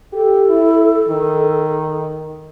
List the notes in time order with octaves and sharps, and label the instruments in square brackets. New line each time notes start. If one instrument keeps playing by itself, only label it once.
[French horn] G4 [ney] A4
[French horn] E4
D#3